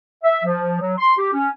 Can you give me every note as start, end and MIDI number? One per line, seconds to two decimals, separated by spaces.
0.24 0.43 76
0.44 0.79 53
0.80 0.93 54
0.98 1.13 84
1.18 1.32 67
1.33 1.48 61